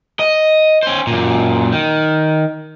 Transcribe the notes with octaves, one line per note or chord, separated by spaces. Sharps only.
D#5
C#4 C5
F#2 A#2
D#3